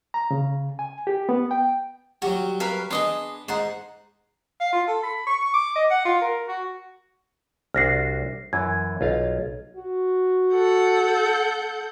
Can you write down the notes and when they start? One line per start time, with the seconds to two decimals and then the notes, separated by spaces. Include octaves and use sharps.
0.14 A#5
0.31 C#3
0.79 G#5
1.07 G4
1.29 B3
1.51 G5
2.22 F#3 G3 F#4
2.60 A#4 B4 F5
2.91 B3 D4 G#4 D#5 C6
3.48 G#2 D#4 F#5 C6
4.61 F5
4.73 F4
4.87 A4
5.03 B5
5.27 C#6
5.54 D6
5.76 D#5
5.91 F#5
6.05 F4
6.21 A#4
6.48 F#4
7.74 C2 D4 F#4 F6 A#6 C7
8.53 F#2 E3 G#6
9.01 B1 F4 F5
9.77 F#4
10.54 A4 F#5 G6